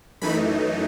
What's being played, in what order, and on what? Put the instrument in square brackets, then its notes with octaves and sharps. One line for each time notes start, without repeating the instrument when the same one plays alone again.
[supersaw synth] F#2 E3 A3 D#4 B5